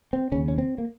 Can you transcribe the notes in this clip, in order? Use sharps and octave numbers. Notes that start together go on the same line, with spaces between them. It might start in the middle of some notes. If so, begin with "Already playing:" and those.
C4
D#2 C#3 C#4
C#4
C4
A#3